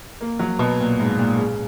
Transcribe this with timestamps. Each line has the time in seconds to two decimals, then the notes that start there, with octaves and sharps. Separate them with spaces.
0.21 A#3
0.39 F#3
0.59 B2
0.80 A#2
0.99 G#2
1.18 A#2
1.38 C#3